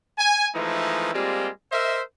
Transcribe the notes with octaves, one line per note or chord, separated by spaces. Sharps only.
G#5
E3 F3 G#3 A3 D#4 E4
G3 G#3 A#3 C4 F4
A#4 C5 D#5 E5